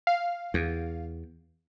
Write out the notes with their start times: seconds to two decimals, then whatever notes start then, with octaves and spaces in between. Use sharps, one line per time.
0.07 F5
0.54 E2